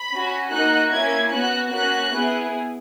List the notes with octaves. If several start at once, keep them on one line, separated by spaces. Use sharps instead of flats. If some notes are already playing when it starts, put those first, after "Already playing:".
Already playing: B5
C#4 F#4
A#3 D#4 F#4 F#6
A#3 C#4 E4 G#6
B3 F#4 F#6
A#3 C#4 F#4 F#6
B3 E4 G#4